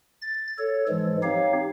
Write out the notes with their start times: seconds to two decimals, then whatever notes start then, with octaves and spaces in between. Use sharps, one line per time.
0.21 A6
0.58 A4 C#5
0.88 G#2 E3 F3 G#3
1.23 C4 D#4 G4 C#5 F5